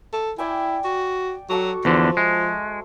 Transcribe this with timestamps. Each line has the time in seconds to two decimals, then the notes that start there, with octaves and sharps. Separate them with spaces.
0.13 A4
0.38 E4 D5 G5 G#5
0.84 F#4
1.49 F#3 F#4 A4 D6
1.85 E2 D3 F3 C5
2.17 G#3 E5